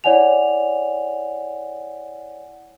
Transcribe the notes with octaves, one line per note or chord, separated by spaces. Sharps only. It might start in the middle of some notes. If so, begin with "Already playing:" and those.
E4 C#5 D5 F#5 G#5 F7